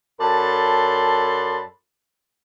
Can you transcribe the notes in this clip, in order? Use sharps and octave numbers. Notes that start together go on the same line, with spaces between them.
F#2 A4 D5 A5 B5 C6